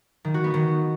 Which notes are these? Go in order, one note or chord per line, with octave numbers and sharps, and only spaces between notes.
D#3
F#4
B3
D#3